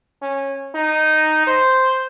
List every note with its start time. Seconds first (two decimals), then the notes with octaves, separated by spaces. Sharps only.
0.22 C#4
0.75 D#4
1.47 C5